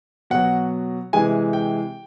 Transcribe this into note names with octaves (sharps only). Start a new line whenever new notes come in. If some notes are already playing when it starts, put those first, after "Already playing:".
B2 F#3 F#5
C3 E3 G#3 G#5
G5